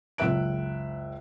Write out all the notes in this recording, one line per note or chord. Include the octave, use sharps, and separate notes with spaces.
F#1 C#2 E5 F#6 D7